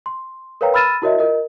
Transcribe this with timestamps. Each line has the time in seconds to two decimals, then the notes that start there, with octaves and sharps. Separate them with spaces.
0.06 C6
0.61 A#4 B4 C#5 F5 G5 A#5
0.74 B5 E6 F6 A6 D#7 E7
1.02 E4 F#4 A#4 C#5 D#5 E5
1.19 F4 A#4 D#5